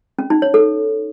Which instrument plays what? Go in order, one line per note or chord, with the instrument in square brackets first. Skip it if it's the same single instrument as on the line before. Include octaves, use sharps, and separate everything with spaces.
[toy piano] C#4
D#4
C#5
A4